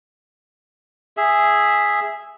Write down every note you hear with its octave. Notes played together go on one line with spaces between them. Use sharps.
G#4 E5